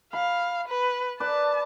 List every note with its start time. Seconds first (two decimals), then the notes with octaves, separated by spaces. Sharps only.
0.13 F5 B5
0.68 B4
1.20 B4 D5 A5